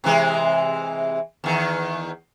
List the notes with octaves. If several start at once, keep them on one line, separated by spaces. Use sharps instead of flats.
C3 E3 G#3
E2 D#3